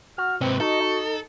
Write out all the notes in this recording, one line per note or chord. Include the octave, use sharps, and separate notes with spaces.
F#4 F6
G#2 C3 C4 B4
D#4 F#4 A4
D#4